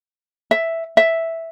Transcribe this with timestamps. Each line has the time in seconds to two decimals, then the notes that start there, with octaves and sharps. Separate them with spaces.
0.51 E5
0.97 E5